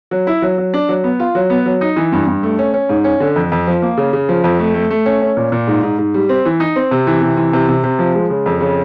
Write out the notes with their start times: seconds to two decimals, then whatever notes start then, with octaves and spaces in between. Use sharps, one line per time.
0.11 F#3
0.27 E4
0.42 F#3
0.58 F#3
0.74 D4
0.89 F#3
1.04 B3
1.20 F4
1.35 F#3
1.50 B3
1.66 F#3
1.81 D#4
1.96 E3
2.12 G2
2.27 G2
2.43 A3
2.59 C#4
2.74 C#4
2.89 G#2
3.04 C#4
3.20 D3
3.36 F2
3.52 F2
3.67 F3
3.82 A#3
3.97 C#3
4.13 C#3
4.29 F3
4.44 F2
4.59 A3
4.75 A3
4.90 A3
5.06 C#4
5.22 C#4
5.37 A#2
5.52 A#2
5.67 G#2
5.83 G#2
5.98 G#2
6.14 G3
6.29 C4
6.45 E3
6.60 D#4
6.76 C4
6.91 C3
7.07 E3
7.22 C3
7.37 E3
7.53 C3
7.69 C3
7.84 C3
7.99 F3
8.15 G#3
8.30 C#3
8.46 F2
8.61 C#3